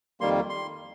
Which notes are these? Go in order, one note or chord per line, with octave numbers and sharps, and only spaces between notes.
F2 D#3 G3 A#3 C6
C6